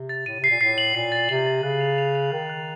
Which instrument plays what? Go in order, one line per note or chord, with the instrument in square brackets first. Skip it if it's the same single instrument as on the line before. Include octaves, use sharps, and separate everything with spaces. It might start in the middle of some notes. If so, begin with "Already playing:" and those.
Already playing: [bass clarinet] C3
[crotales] A6
[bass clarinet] A2 [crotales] D#7
[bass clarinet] C3 [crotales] C7
[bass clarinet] A#2
[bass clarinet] A2 [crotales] C7
[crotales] F#7
[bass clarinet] A#2 [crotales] C7
[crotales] A6
[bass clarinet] C3 [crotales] F#7
[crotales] A6
[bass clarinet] C#3 [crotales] F#6
[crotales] F7
F7
F7
[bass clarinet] D#3 [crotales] F#6
[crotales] F#6